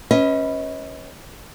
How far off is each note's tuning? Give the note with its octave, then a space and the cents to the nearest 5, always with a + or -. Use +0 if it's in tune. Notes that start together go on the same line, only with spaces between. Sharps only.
C#4 -10 B4 +0 D#5 +35